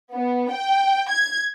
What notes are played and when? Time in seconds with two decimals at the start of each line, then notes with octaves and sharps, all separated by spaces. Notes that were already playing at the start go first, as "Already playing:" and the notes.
0.14 B3
0.52 G5
1.10 G#6